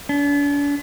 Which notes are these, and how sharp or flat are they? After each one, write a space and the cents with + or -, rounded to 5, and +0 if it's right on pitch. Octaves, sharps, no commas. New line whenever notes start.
D4 -40